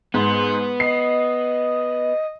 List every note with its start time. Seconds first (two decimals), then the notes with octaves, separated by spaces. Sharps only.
0.14 G#2 B3
0.80 D#5 C7